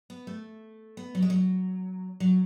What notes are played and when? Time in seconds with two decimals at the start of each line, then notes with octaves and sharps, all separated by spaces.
0.10 B3
0.27 A3
0.97 B3
1.15 F#3
1.22 G#3
1.30 F#3
2.20 F#3